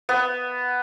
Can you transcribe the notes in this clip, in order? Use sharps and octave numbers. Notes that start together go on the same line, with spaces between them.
B3